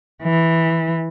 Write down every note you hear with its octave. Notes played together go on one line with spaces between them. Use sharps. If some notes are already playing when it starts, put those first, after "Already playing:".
E3